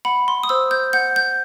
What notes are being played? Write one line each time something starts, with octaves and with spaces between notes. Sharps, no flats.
F#5 B5
C6
D#6
C5 E6
G6
F#5 G6
G6